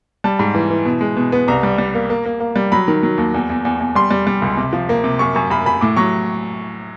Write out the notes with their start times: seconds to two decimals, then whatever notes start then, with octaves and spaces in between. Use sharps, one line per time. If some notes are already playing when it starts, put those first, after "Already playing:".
0.24 G3 A5
0.39 G#2
0.55 E3
0.70 E3
0.85 B2
1.01 G#3
1.16 B2
1.32 B3
1.48 C2 A#5
1.63 G3
1.78 G3
1.95 A#3
2.10 A#3
2.26 A#3
2.40 A#3
2.56 G3
2.72 F#3 B5
2.88 D#3
3.03 F#3
3.18 D#2
3.34 E2
3.50 E2
3.65 E2
3.80 E2
3.95 G3 C6
4.11 G3
4.27 G3
4.42 C#2
4.57 C3
4.73 F3
4.89 A#3
5.04 C3
5.19 F#2 C#6
5.35 F#2 C#6
5.50 F#2 B5
5.66 F#2 B5
5.81 A2 D6
5.97 F#3 C#6